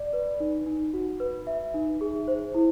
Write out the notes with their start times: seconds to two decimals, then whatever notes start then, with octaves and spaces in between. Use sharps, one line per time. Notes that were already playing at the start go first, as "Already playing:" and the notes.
Already playing: D5
0.13 B4
0.40 D#4
0.66 D#4
0.94 F#4
1.20 B4
1.47 E5
1.74 D#4
2.01 G#4
2.28 C5
2.55 E4